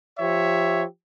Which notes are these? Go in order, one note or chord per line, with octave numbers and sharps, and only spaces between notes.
F3 G4 C#5 E5